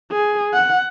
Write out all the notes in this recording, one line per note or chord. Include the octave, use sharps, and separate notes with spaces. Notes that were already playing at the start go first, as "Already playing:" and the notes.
G#4
F#5